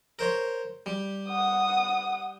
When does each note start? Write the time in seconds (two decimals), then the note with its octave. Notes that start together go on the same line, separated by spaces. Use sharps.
0.19 A#4 C5 C#5
0.86 G3
1.28 F#5 D#6